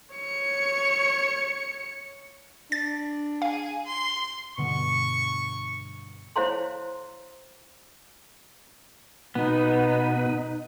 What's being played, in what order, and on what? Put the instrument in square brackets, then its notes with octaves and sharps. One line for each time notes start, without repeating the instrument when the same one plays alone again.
[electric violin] C#5 C#7
[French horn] D4 [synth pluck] A6
[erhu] G#4 [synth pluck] F5
[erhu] C6
[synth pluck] G2 B2 D3 [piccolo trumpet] C#6
[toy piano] E4 C5 C#5 F5 A#5 C6
[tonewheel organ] B2 B4 [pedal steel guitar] B3 [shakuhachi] D#4